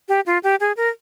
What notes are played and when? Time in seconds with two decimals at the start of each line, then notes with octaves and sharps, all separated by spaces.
0.08 G4
0.26 F4
0.43 G4
0.60 G#4
0.77 A#4